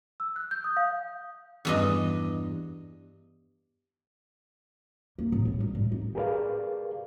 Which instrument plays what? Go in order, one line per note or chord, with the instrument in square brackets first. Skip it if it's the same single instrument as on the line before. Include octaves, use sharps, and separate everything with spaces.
[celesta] E6
F#6
G6
D#6
F5
[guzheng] E2 G2 D#5
[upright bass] A#3
A2
A1
G3
A2
D#4
[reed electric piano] G4 G#4 A#4 B4 D5 F5